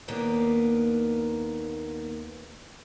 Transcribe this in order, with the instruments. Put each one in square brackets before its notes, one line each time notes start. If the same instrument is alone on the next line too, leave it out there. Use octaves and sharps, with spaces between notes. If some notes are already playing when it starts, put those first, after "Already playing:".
[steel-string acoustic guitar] D#2 A#3 B3 D4 A#4